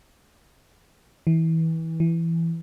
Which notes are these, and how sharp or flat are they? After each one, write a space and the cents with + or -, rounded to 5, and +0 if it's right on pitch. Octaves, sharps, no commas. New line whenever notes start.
E3 -25
E3 +10